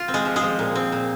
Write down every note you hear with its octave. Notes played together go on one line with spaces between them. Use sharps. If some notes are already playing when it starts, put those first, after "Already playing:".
Already playing: F4
C4
G#3 G#4
F3
G#3 G#4
F3
A#2
C4
A#2